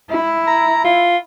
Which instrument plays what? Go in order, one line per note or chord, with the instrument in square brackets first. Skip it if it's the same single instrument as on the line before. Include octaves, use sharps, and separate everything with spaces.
[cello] E4
[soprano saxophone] A#5
F4